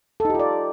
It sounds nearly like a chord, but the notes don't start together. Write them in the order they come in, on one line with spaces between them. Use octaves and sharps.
A4 D#4 G4 F4 D5